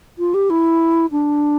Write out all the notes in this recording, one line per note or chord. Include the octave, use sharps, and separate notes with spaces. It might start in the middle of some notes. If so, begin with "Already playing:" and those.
F4
G4
E4
D4